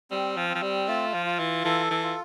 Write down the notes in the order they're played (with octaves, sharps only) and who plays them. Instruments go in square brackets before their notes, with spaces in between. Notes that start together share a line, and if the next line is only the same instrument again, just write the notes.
[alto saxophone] G3 [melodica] C4
[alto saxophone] F3
[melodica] C4
[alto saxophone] F3
G3
[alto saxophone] A3 [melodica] F4
[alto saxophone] F3
[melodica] F4
[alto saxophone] E3
[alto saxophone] E3 [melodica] A4
[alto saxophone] E3
[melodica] F4